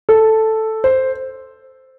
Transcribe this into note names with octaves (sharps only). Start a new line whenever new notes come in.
A4
C5